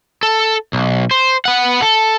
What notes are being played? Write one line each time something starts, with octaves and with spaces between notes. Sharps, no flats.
A4
B1
C5
B3 F#5
A4